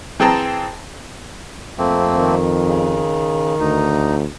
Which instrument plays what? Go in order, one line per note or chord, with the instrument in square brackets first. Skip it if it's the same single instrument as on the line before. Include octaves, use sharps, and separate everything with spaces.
[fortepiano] E3 C4 G#4 G5 A5 A#5
[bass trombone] F2 [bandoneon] A3 A#3 C4
[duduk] D#3
[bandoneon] C#3
[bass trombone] D2 [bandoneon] D#4